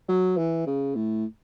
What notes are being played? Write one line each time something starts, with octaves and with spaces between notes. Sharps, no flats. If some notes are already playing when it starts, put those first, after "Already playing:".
F#3
E3
C#3
A2